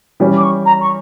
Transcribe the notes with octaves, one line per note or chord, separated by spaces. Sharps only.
E3 G3 C#4
D6
C#6
A#5
C#6